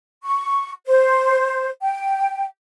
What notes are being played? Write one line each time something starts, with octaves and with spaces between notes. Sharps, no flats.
C#6
C5
G5